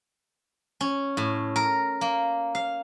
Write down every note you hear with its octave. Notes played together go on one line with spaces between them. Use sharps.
C#4
A2
A#4
A#3
F5